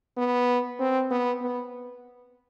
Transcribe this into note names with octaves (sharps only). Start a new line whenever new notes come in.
B3
C4
B3
B3